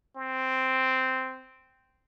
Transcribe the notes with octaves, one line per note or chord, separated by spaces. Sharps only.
C4